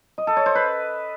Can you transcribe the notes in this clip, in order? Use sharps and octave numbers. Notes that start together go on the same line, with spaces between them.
D#5
A4
C#5
C5
B4